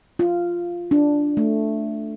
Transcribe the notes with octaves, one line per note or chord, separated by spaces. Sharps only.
F4
D4
A3